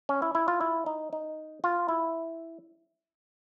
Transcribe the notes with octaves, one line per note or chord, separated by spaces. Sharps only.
C#4
E4
E4
F4
E4
D#4
D#4
F4
E4